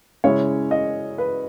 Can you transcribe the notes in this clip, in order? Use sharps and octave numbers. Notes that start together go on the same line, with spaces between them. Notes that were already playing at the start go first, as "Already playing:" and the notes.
C#3 G#3 C#4 E4 C#5
D#5
B4